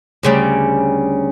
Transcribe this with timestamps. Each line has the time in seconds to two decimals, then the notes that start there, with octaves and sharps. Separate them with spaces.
0.23 D2 C#3 G3